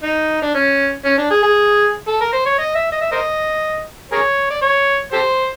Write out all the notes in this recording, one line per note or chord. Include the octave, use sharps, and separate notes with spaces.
D#4
D4
C#4
C#4
D4
G#4
G#4
A4
A#4
C5
C#5
D#5
E5
D#5
E5
A#4 C5 D#5
G#4 A#4 C#5
D5
C#5
G4 A4 C5